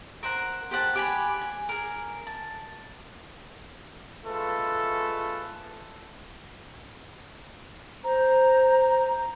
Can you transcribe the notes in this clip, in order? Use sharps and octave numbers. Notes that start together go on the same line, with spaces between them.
A#4 C5 F#5 A#5
G4 C5 F#5 A5
G4 G#5 B5
G#5
G#4 A#4
A5
G#3 A3 F4 A4 B4
C5 A#5